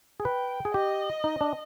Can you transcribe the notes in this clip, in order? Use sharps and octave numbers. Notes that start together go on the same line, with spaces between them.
G#4
B4 G5
G#4
G4 D#5
D#4
D4